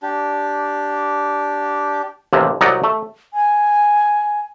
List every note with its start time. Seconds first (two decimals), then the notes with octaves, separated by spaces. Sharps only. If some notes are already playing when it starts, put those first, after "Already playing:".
0.03 D4 G4
2.33 A1 D#2 C3
2.61 C2 F#3 D#4 D5 D#5 F#5
2.84 A3
3.34 G#5